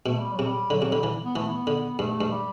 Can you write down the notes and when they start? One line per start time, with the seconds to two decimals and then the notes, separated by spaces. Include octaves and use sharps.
0.06 B2 A3
0.19 G3
0.33 F#3
0.39 C3
0.45 G3
0.70 D3 F#3
0.82 C3 F#3
0.92 D3 G3
1.03 E3
1.25 B3
1.36 E3 A3
1.47 B3
1.67 D3
1.99 G2 A3
2.21 G2
2.32 G3